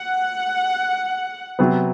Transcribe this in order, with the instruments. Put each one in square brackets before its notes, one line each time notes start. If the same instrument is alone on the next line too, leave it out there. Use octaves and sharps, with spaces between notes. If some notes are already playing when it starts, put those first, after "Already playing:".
Already playing: [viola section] F#5
[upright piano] C3 F#3 B3